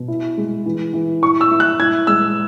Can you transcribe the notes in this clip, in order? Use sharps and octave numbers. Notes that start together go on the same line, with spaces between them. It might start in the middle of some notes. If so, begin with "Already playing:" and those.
Already playing: B2
E4
G#3
E3
E3
E4 C#6
E6
E4
F#6
E4 G#6
G#3 E6